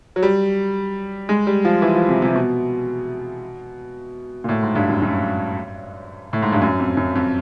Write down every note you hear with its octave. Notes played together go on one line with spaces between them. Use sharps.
F#3
G3
G#3
G3
F3
E3
F3
C3
C3
B2
A#2
A2
G#2
G2
F#2
F#2
A2
G#2
G2
F#2
F2
F#2
F2